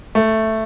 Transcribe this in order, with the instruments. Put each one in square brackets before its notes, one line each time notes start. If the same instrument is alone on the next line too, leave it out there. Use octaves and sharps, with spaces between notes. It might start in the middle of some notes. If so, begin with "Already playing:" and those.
[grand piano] A3